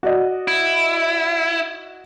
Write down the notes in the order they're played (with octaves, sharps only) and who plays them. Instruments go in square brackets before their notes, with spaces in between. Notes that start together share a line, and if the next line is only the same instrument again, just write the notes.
[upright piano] F#4 D5 D#5
[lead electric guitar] E4